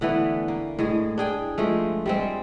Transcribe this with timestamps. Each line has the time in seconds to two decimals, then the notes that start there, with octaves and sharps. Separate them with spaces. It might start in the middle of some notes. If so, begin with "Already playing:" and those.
0.01 D3 E3 A3 B3
0.48 A#3
0.79 A2 G#3 G#4
1.18 D4 G#4 G5
1.58 F3 G#3 A3
2.06 G3 G#3 C4